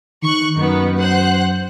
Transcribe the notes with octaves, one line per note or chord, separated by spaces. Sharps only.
D#3 C#6 F#6
F#2 D#3 B3
C5 F#5 F#6